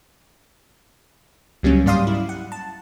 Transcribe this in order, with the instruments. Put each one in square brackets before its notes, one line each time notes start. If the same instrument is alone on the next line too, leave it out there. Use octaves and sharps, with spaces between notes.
[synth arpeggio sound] C#2 F#3 G3 A#3 C#4
G#2 G3 D5 F5 C6 D#6
E4
F#5
A5